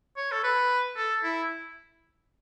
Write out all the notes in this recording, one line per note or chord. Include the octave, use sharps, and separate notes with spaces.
C#5
A4
B4
A4
E4